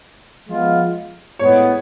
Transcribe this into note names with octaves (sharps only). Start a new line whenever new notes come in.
F3 G#3 B3 F4
A2 G#3 B3 C#5